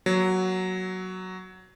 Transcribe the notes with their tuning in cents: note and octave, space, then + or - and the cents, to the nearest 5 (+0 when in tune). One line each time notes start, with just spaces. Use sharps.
F#3 +5 A#3 +30